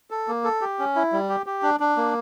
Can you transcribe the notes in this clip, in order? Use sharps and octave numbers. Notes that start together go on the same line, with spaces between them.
A4
A#3
A4
G4
C#4
E4
G3
G4
G4
D4
D4
A#3